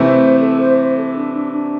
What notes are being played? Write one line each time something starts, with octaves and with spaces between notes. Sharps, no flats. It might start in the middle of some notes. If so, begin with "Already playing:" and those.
Already playing: C3 E3 A3 E4 C5
A4
C5
C5
A4
D4
D4
D4